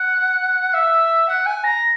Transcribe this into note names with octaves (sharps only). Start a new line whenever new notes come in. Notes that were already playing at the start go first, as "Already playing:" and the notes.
Already playing: F#5
E5
F#5
G#5
A#5